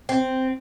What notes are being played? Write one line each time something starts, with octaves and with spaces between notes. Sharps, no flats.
C4